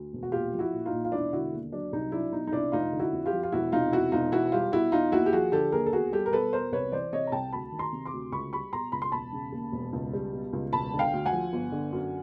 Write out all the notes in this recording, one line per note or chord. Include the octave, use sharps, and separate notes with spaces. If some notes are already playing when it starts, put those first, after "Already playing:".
Already playing: D2
E1
F#4
A#1 F4 G4
F3
E4 F#4
A#2
D#4 F4
A#1
F4
E1 D4 E4
D3 E4 F#4
D#2
F#3 D4
C2 D#4
F#3 D4 E4
B2 D#4
D#4
C2 D4 E4
F1 D#4 F4
D3
E4 F#4
F2
F4 G4
F3
F4
E1 E4 F#4
C3 D#4 F4
E2 E4 F#4
E1 D#4 F4
E2 E4 F#4
G3 F4 G4
B2 E4 F#4
E2 D#4 F4
D#2 E4 F#4
G4
F3 F#4 G#4
D3 G4 A4
D#2 G#4 A#4
A4
E2 F#4 G#4
G3 G4 A4
A#4
B2 A4 B4
E2 A#4 C5
C2 B4 C#5
E3 C5 D5
C3 C#5 D#5
A#5
C2 G5 A5
D2 A5 B5
D#3
A#5 C6
C3
C6 D6
D2
C#2 B5 C#6
G3 B5 C#6
B2 A#5 C6
C#2 B5
C6
E1 A5 B5
C#3
D#2
E1
C#2
G3
B2
C#2
E1 A5 B5
D3
F5 G5
D2
F#5 G#5
F3
G1
D3
F#2